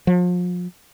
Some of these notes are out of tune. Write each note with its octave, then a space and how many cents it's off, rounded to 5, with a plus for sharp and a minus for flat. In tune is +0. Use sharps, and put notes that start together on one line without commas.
F3 +35